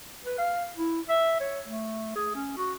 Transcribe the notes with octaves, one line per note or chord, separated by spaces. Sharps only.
B4
F5
E4
E5
C#5
A3
G#4
C#4
F#4